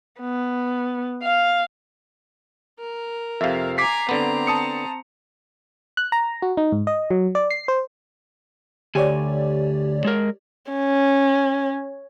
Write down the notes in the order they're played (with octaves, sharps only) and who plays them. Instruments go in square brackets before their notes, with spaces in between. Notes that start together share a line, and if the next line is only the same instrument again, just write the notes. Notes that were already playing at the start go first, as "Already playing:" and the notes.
[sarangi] B3
F5
[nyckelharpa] A#4
[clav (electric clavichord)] F2 C3 [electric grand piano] E5 F5
[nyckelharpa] G#5 A#5 [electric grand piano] D6 B6 C7
[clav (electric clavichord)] D3 B3 [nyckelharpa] C4 A#5
[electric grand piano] A5 D#6 C#7
[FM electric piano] F#6
A#5
F#4
D#4
G#2
D#5
F#3
D5
C7
C5
[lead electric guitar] D2 G#5 [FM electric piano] G4 C#5 D5
[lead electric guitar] G#3 A#4
[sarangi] C#4